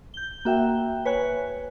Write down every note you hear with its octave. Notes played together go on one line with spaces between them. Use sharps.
G6 G7
A#3 F#4 E5 G5
B4 C#5 G#5 F#6